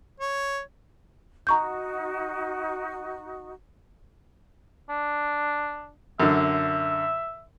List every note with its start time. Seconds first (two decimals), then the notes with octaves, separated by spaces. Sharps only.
0.20 C#5
1.47 D#4 F#4 A#5 C#6 G6
4.89 D4
6.20 F#2 D3 E5